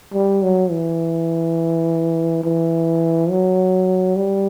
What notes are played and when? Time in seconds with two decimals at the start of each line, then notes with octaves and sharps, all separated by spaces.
0.13 G3
0.42 F#3
0.71 E3
2.44 E3
3.30 F#3
4.16 G3